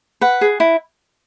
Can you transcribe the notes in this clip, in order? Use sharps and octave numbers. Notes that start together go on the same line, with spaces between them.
B4 F#5
G#4
E4